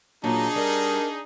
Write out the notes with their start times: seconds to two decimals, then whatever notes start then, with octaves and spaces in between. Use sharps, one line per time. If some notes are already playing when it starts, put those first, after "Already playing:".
0.24 A#2 F#3 D4 D#4 F#4 G#4 A#5
0.56 G3 A#4